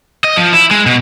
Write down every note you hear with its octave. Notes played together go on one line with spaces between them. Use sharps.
D#5
F3
E4
G#3
B2